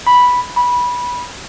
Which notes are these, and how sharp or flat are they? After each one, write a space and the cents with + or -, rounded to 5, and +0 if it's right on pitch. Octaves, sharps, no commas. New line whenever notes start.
B5 -5
B5 -15